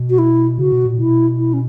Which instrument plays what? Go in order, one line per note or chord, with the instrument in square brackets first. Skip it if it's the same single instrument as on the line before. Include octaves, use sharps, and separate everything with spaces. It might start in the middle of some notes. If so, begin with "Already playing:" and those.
Already playing: [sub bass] B2
[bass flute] F#4
E4
[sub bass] C#3 [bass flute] F#4
[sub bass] B2
A#2
[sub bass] B2 [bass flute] E4
[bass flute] E4
C#4